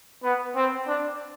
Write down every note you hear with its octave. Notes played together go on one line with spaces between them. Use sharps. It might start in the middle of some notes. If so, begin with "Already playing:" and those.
B3
C4
D4